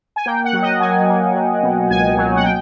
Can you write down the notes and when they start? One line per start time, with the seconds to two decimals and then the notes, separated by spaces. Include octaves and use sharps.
0.16 G#5
0.26 A#3 G5
0.44 F#5
0.53 F#3
0.62 D#5
0.80 F#3 G#5
1.08 A#3
1.35 F#3
1.63 B2
1.90 C#2 G#5
2.17 F#3
2.36 F#5
2.44 G5